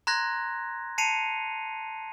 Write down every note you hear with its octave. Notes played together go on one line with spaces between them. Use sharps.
A#5 C6 F#6 G#6 A#6
A5 C7 C#7 D#7 F7